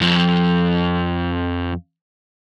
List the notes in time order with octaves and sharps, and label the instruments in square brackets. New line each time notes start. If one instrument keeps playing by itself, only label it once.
[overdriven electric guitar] F2 F3